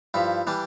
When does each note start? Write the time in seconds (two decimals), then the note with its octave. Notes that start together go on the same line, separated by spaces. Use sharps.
0.14 G2 F3 E4
0.47 E3 G3 D4